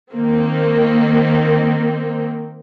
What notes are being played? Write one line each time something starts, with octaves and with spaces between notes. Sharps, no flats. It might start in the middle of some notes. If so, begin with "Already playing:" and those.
D#3 A#3 C4